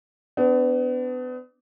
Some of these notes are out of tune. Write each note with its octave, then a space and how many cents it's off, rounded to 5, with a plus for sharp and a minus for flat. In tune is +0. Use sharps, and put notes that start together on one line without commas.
B3 +35 D4 +0